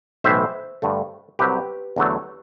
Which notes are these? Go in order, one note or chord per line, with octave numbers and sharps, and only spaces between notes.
B1 A2 E3 C5 E5
G2 D3 A3
C2 C3 F#3 G4 B4
E2 D3 F#3 A3